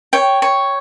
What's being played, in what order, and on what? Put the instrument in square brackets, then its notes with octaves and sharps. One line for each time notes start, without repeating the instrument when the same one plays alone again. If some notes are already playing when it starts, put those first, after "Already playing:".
[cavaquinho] C#5 G5
C#5